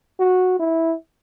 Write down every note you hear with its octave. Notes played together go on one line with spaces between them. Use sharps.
F#4
E4